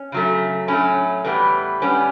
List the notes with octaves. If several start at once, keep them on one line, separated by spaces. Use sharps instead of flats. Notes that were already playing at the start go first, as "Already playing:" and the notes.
Already playing: C#4
C#3 F#3 A3
A2 F#3 A3 C#4
A2 E3 G3 B3
A2 G3 B3 C#4